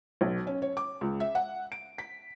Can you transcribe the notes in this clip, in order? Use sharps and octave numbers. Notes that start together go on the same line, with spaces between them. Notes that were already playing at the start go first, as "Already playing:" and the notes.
B1
C#4
C#5
D6
C#2
E5
F#5
D7
B6